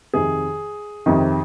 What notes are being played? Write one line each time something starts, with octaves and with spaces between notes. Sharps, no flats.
F2 C3 D#3 G#4
F2 C3 D#3